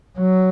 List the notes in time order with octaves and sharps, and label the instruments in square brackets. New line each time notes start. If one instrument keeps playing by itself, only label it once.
[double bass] F#3